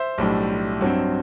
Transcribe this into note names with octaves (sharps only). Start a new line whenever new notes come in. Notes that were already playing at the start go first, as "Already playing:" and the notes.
Already playing: C5 E5
B1 A2 G3 D4
G2 F#3 C4